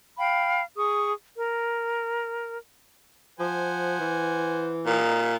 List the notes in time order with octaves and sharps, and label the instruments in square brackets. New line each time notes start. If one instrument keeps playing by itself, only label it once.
[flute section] F5 G5 B5
G#4 C#6 D#6
A#4
[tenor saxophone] F3 [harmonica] C5 F#5 G#5
[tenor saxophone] E3
[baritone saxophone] A#2 [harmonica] D#4